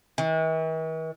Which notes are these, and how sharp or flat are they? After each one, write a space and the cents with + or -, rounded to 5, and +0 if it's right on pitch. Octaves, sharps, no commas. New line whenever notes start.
E3 -45